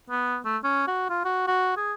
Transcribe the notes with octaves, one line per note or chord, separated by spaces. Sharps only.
B3
A3
C#4
F#4
F4
F#4
F#4
G#4